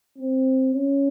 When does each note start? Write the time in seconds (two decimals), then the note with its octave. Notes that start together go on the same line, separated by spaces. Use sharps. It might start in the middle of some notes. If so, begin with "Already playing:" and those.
0.18 C4
0.73 C#4